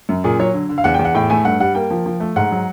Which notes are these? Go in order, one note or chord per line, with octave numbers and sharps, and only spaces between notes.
F#2
A#2 G#4
F#3 C#5
D3
D3
F5
E2 F#5
G5
E2
F#5
A2 G5
A3 G#5
G2 F#5
G3 F#5
A#3 G5
F3
F3
A3
G#2 F#5
F#3